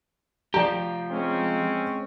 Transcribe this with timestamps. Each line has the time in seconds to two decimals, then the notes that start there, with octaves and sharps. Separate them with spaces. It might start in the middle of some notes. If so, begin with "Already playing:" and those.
0.54 F3 G4 D5 G5 A#5
1.11 G#3 C4 C#4